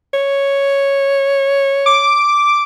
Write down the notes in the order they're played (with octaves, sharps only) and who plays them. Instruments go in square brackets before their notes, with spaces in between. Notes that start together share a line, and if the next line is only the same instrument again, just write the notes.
[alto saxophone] C#5
[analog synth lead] D6